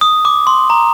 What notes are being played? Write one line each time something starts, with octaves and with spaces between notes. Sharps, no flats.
D#6
D6
C6
A#5